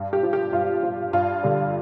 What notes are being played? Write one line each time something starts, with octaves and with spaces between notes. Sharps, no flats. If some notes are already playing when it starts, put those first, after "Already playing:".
Already playing: G2
G4
F3
G4
G2 F4
F3
G2 F4
D3 G3